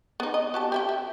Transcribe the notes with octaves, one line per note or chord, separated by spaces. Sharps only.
B3 D#4
D#5
F#4 G4 A5
G4 E5 G5
E5